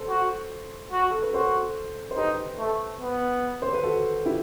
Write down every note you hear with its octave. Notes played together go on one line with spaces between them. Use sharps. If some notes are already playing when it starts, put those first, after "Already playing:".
Already playing: A4 C5
F#4
F#4
A4
B4
F#4 A4 C5
C5
D#4 G4 B4
A3
B3
C5
B4
F#4 A4
E4 G4